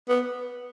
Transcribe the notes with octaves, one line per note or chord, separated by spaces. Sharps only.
B3